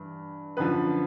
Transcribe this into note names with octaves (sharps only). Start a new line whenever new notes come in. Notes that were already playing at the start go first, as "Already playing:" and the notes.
Already playing: G2 E3
F#2 D3 F3 B4